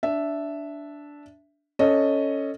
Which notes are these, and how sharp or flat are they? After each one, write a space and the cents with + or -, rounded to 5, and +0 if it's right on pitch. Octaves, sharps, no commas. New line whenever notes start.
D4 -10 E5 +0
C#4 +0 A4 +10 D#5 +0